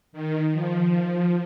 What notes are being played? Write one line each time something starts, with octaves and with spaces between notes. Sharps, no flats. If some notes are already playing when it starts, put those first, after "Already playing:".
D#3
F3